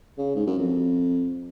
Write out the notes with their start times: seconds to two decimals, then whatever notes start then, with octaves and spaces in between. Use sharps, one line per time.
0.18 C#3
0.35 G#2
0.47 F#2
0.58 F2